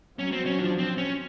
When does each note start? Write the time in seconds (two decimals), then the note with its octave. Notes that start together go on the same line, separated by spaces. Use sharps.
0.19 F#3 C#4
0.32 C4
0.46 C#4
0.58 F3 D4
0.78 C4
0.98 C#4